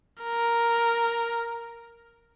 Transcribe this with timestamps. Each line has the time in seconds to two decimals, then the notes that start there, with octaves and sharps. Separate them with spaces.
0.23 A#4